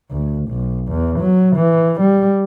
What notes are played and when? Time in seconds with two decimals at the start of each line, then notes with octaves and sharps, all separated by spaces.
0.11 D2
0.50 B1
0.89 E2
1.19 F#3
1.56 E3
2.00 G3